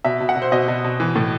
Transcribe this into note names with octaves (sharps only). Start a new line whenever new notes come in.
B2 E5
B2
F#5
B2
C5
B2 D#5
B2
B2
E3
A2